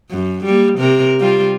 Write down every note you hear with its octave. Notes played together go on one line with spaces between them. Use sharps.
F#2
G3 A#3
C3 A#4
G3 C4 F4